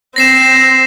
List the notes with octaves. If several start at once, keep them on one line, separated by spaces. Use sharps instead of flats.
C4 A#6 C7 E7